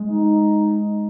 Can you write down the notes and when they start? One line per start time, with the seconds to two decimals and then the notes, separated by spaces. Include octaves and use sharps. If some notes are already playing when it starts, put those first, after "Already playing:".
Already playing: G#3
0.10 D#4